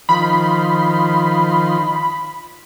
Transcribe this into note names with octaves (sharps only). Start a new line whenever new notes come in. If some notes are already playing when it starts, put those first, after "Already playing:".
D#3 F3 B5 C6